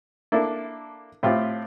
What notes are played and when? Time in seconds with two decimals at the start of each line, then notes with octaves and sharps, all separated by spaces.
0.32 A#3 D4 E4 A4
1.23 A2 C4 F4 G4